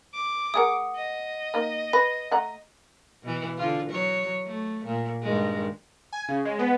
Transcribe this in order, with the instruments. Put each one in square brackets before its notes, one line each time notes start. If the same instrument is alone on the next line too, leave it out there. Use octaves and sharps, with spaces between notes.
[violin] D6
[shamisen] A3 G#4 A#4 [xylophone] F#5 D#6
[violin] D#5
[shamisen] A#3 D#4
[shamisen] B4 [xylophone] A#6
[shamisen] A3 F#5 A#5
[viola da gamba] B2 E3
D3 F4
F#3 C#5
A3
A#2
G2 D#3 G#3
[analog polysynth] G#5
C#3
G#3
B3